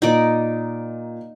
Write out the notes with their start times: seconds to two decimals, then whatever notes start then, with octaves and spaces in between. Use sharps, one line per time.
0.02 A#2 D#4 D5